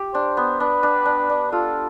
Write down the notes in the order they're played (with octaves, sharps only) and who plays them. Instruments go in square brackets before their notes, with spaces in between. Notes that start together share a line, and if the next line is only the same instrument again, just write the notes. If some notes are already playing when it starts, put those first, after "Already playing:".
Already playing: [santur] G4
[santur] D4 [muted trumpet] C5
[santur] B3
[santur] D4 [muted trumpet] B4
[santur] D4
D4
D4
[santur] F4 [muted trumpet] A4